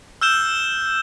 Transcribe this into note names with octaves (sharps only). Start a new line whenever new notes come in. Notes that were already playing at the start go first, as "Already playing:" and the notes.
E6 F6 G6 E7 G7